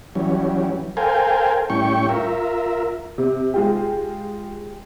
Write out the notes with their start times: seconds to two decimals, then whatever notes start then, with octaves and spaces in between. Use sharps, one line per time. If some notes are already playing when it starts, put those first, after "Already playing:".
0.15 E3 F#3 G3 C#4
0.97 A4 A#4 C5 F5 G5 G#5
1.70 A2 G3 C#4 E4 G5 C#6
2.09 F4 A#4 E5
3.18 C3
3.54 G#3 F4 G4